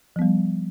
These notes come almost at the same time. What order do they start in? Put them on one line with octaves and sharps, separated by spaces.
F3 B3 G3